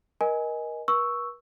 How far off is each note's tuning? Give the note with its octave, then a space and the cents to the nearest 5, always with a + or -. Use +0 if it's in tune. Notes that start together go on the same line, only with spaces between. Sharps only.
A#4 +25 D#5 +0 G#5 +5
B4 -45 C#6 +0 E6 +0